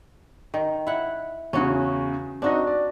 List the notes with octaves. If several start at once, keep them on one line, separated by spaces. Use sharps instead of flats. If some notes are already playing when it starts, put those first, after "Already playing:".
D#3
E4 F#5
E2 C#3 C#4 F#4
C4 D4 D#4 F#4 D#5
D5